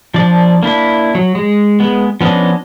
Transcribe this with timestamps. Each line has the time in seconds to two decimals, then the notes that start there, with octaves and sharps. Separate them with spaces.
0.14 F3 D4 D5
0.63 A#3 D4 E4
1.15 F#3
1.35 G#3
1.80 G#3 B3
2.21 F3 B3 C#4 D4 D#5